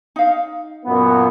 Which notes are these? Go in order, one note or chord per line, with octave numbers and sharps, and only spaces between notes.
D#4 F5
F#2 A#2 B3